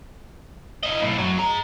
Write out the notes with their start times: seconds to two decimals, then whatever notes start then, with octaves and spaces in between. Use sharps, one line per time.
0.83 E4 D#5
1.01 B1 A2
1.17 F#2 F#3
1.38 G#4 A#5